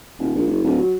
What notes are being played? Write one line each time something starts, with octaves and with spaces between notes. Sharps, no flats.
D#1
A#1
F#1
D1
F#3